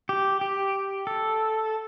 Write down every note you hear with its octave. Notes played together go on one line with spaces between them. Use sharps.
G4
G4
A4